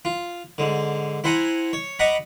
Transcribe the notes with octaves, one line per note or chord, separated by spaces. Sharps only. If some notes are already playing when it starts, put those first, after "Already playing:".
F4
G#2 D3
E4 C5 F#5 G#5 A#5
C#5
D#5 F#5 A#5 B5 C#6 D6